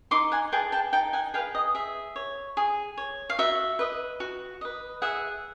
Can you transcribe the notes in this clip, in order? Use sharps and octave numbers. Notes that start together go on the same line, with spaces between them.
D#4 C6 D6
F#5 G#5
G#4 B4 G5 A5
G5 A5
D#4 G5 A5
F#5 G#5
G#4 B4 F5 G5
D#5
G#4 E5
C#5
G#4
C#5
F5
F#4 E5
B4 D#5
F#4
B4 D#5
G#4 E5 F#5